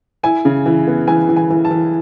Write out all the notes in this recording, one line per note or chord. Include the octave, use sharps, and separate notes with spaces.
E4 G#5
C#3
E3
B3
E3 G#5
E3
G#5
E3
A5
E3